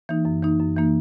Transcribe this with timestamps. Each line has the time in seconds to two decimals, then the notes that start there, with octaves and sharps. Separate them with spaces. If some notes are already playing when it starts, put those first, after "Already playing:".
0.09 E3 A#3 D#4
0.25 F#2
0.43 E3 A#3 D#4
0.59 F#2
0.76 E3 A#3 D#4